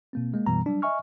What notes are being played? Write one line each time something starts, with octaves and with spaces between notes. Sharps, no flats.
B2 A#3 C4
G#3 A#3
F#2 B2 E3 G3 B3 A#5
F#3 G3 D4
D#5 E5 G#5 C#6 F6